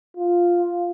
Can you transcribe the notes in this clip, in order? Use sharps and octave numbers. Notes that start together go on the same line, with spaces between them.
F4